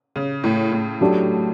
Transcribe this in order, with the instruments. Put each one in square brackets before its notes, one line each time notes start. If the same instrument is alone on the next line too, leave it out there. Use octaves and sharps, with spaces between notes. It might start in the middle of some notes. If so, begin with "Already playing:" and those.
[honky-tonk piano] C#3
A2
A2
[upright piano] F#3 A3 D4 G4